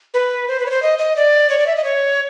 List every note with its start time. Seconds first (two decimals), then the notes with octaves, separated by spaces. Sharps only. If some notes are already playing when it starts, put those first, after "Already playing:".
0.14 B4
0.48 C5
0.60 B4
0.66 C#5
0.71 C5
0.82 D#5
0.99 D#5
1.16 D5
1.50 C#5
1.59 D5
1.67 E5
1.76 D#5
1.84 C#5